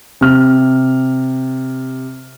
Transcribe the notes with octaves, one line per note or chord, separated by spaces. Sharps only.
C3 F6